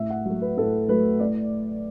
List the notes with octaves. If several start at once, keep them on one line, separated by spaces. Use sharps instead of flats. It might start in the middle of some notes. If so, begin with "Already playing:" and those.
Already playing: A2 E5
F#5
F#3 A3
B4
A2 A4
F#3 A3 B4
A2 D5